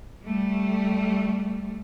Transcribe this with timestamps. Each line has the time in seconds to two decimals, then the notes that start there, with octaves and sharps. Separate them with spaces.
0.24 G3 A3